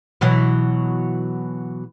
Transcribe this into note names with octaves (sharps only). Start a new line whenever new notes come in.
B2 E3 F#3